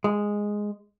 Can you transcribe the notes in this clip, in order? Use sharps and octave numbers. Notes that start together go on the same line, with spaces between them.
G#3